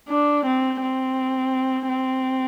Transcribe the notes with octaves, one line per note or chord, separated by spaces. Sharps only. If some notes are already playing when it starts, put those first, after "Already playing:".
D4
C4
C4
C4